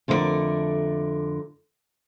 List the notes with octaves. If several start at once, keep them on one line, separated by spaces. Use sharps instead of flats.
F2 D3 A3 F4 A#4 D5